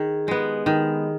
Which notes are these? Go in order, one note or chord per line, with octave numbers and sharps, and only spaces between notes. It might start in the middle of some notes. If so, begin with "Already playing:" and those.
Already playing: D#3 G#4
G#3 B3 G4
D#3 G#4